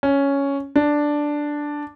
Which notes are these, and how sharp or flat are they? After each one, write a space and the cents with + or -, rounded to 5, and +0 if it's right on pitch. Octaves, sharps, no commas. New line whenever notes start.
C#4 +5
D4 +0